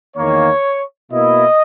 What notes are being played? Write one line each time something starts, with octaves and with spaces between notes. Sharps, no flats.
E2 D#3 A#3 C#5
B2 A#3 E4 D#5